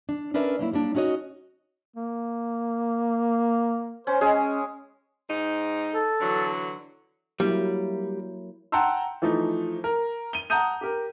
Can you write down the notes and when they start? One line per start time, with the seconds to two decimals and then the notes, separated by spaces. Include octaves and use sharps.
0.09 D4
0.34 C#4 D4 A#4 B4 D5 E5
0.59 F#3 A#3 E4
0.72 F#3 G3 A#3 D4
0.95 C#4 D#4 F#4 C#5 D#5
1.96 A#3
4.07 C#4 C5
4.21 G#3 C#4 G#4
5.29 G#2 D#4
5.95 A4
6.21 D3 E3 F#3
7.40 F#3 G3 A#3 E4
8.72 F#5 G5 A5 A#5 C6 E6
9.22 E3 F3 A3 D#4
9.84 A#4
10.33 D#7 G7
10.50 F#5 A5 A#5 D#6 G6 D#7
10.81 G4 A#4